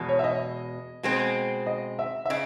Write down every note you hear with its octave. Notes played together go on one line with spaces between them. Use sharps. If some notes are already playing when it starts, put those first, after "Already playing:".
Already playing: E2 B2 G#3
C#5
E5
D#5
B2 G#3 C4
D#5
E5
E5
C#3 D#5